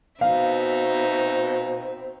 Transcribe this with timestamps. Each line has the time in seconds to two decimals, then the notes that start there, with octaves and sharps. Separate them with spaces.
0.21 B2 C4 D#4 E5 F5